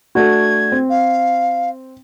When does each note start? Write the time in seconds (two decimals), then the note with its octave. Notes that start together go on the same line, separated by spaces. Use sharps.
0.15 A3 D4 F#4 G#6
0.72 C4
0.89 F5